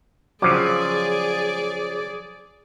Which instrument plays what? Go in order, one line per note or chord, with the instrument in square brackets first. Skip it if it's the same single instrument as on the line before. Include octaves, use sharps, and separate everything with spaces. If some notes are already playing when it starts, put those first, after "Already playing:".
[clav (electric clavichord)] C#3 F3 F#3 [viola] G#4 D5 [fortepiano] D6